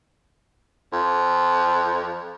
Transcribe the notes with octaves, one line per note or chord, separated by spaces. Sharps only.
F2